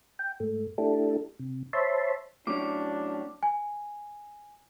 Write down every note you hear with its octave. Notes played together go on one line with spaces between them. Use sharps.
G5
G#2 A3
A3 D4 E4 G4 A4
C3
C5 C#5 E5 A5 B5 C6
A2 F#3 C#4 D4 D6
G#5